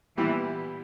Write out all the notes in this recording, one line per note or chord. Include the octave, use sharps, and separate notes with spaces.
A#2 E3 G3 B3 E4 G4